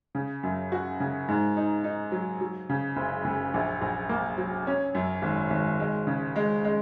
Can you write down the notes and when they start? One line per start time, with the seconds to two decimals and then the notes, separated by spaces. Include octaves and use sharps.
0.15 C#3
0.43 F#2
0.72 F#4
1.00 C#3
1.28 G#2
1.57 D#4
1.84 D#4
2.12 F#3
2.41 F#3
2.69 C#3
2.96 F#1
3.25 F#1
3.54 A#1
3.82 A#1
4.09 A#3
4.38 F#3
4.67 C#4
4.95 F#2
5.22 G#1
5.50 G#1
5.80 G#3
6.07 C#3
6.36 G#3
6.64 G#3